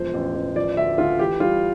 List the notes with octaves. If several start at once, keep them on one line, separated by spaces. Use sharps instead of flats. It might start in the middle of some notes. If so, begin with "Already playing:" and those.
Already playing: E1 F3 C5
A1
A1
F3 D5
D2 E5
D2 F4
E3 G4
G3 F4